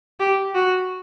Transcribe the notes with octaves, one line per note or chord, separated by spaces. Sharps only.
G4
F#4